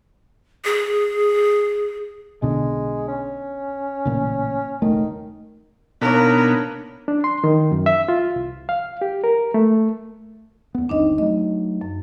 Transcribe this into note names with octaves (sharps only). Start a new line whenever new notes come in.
G#4
B1 B2 D3 G#3
C#4
A1 A#2 C#3
E1 C#2 D#3 A3
B2 A#3 B3 D4 D#4 A#4 C#5
D4
C6
D#3
F#2
E5
F4
C2
F5
G4
A#4
A3
E2 B3
G1 D#2 C4 D4 D#4 D#5
F#3 A3 D#5
F#2